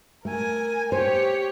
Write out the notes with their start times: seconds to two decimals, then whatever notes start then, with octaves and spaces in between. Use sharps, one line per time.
0.25 A3 A#4 G#5
0.92 G4 C5 C#5